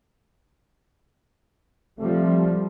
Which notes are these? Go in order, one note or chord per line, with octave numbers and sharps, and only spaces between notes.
C3 F3 G3 A3